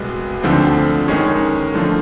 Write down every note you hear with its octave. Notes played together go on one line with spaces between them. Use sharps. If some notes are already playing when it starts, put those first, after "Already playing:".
Already playing: C2 B2 G#3 B3
D2 D3 F3 A3 C4
D#3 G#3 C#4
D3 F3 A3